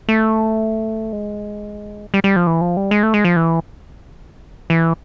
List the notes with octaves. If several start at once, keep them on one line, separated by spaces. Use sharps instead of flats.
A3
G#3
G3
G3
F3
E3
F3
G3
G#3
A3
G#3
F3
E3
E3